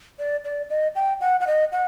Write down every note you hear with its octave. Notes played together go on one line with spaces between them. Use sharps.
D5
D5
D#5
G5
F#5
F#5
D#5
F#5